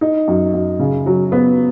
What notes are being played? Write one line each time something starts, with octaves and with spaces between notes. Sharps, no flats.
D#4
F#2
F#2
C#3
F#3
B3